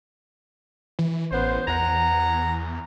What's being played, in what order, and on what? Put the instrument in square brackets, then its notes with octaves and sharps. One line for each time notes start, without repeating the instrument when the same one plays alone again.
[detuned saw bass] E3
[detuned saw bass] A1 [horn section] B3 C#4 C5
[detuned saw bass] E2 [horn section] F#5 G#5 A#5